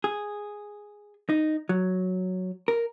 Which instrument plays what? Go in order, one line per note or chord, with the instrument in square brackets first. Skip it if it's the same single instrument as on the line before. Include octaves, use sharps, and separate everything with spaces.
[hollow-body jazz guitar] G#4
D#4
F#3
A#4